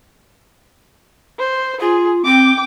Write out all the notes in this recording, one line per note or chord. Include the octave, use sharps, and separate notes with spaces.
C5
F4 G#4
C4 G5 D6